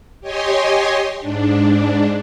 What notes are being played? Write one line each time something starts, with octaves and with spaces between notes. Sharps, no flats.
G4 C#5 D#5 G#5 C6
G#2 D4